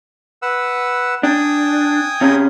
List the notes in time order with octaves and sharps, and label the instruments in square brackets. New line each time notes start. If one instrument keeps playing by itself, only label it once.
[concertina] B4 F#5 E6
[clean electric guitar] D4 [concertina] G5 G#5 D#6
[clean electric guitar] C3 C#4